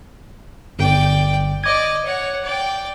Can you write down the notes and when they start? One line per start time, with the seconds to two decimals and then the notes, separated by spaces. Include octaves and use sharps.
0.79 G1 D5 G5
1.64 D5 D#5 D6 G#6
2.05 C#5 F#5
2.44 D5 G5